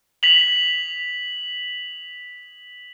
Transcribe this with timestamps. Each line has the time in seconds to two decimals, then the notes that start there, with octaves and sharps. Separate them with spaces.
0.23 B6 F7 F#7